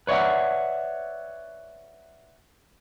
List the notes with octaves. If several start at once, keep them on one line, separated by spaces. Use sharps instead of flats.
B4 C#5 D5 E5 F#5